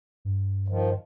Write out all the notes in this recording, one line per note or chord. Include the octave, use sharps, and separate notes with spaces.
G2
D#3 F3